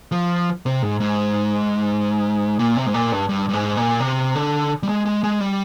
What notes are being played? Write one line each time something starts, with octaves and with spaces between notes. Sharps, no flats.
F3
C3
G#2
G#2
A#2
C3
G#2
A#2
G2
G2
G2
G#2
A#2
C3
D3
G3
G#3
G#3
G#3
G3